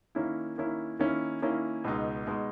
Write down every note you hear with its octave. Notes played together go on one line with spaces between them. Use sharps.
D#3 A#3 C#4 E4
D#3 A#3 C#4 E4
D#3 A#3 C#4 E4
D#3 A#3 C#4 E4
C#2 B2 G#3 D#4
B2 G#3 D#4